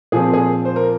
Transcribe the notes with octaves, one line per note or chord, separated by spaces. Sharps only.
A#2 F3 C4 G#4
G#4
C5
A#4